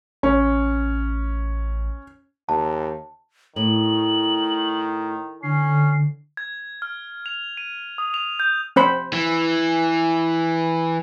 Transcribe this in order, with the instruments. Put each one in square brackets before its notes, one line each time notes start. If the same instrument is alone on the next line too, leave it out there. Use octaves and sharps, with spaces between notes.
[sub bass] A1 [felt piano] C#4
[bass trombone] D#2 [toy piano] A5
[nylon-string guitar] A2 [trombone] D#3 [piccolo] F#7
[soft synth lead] D3 [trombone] C#4 [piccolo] C7
[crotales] G#6
F6
F7
D#7
D#6
F7
G6
[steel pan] C4 C5 B5
[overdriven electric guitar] E3